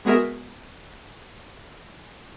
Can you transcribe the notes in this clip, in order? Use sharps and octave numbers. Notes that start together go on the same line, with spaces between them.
G#3 B3 F#4 G#4 A#4 E5